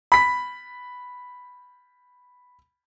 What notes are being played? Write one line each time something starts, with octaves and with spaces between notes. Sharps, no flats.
B5 B6